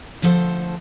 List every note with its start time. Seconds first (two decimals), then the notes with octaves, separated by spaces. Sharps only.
0.22 D3 F3 A3 A4 C5